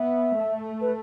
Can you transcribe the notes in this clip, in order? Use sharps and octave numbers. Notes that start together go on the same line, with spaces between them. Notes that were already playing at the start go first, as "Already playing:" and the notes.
Already playing: B3 E5
A3
B4